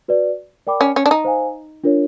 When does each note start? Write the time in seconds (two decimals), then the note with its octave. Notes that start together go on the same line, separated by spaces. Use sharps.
0.08 F#4 B4 D5
0.67 A#4 D5 G5 B5 D6
0.81 C#4
0.96 C#4
1.06 D4
1.11 D#4
1.25 C5 F5 G#5
1.84 D4 F4 A#4 C#5